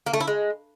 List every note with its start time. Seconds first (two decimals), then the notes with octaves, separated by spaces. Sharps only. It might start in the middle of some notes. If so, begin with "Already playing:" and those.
0.06 A#3
0.13 A3
0.20 E4
0.28 G#3